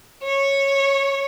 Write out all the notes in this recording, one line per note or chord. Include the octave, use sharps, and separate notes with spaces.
C#5